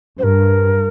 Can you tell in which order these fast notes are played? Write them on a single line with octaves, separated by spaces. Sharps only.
G2 C5 A#4